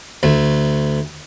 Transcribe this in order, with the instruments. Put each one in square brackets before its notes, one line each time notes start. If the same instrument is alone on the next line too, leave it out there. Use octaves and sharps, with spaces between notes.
[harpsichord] D2 A3